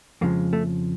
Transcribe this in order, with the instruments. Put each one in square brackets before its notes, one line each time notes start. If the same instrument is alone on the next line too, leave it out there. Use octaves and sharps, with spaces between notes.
[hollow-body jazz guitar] F2 C#3 F3 G#3 A#3
A3